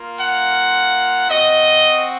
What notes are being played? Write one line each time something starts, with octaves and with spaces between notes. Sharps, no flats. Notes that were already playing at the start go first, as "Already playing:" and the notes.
Already playing: A#3 F4
F#5
C4 F#4 D#5